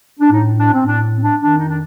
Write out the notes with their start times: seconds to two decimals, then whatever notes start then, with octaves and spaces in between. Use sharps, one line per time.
0.20 D4
0.32 A2 D#4
0.59 D4
0.72 C4
0.86 A2 D4
1.18 C4
1.22 D4
1.40 F2 D#3 D4
1.58 D#4
1.68 D4